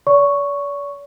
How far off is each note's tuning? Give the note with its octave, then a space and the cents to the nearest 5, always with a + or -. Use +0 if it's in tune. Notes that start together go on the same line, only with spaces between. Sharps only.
D5 -45 C#6 +0